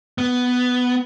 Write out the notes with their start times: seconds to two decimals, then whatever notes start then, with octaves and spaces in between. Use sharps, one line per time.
0.18 B3